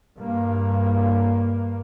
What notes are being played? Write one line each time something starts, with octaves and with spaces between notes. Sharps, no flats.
G2 A#3